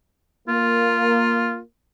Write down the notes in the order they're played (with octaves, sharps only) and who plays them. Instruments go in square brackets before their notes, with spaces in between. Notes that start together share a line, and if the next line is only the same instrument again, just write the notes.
[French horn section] A#3 [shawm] F4